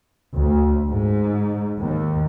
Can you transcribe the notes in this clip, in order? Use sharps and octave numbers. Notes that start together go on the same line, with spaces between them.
D2
G#2
D#2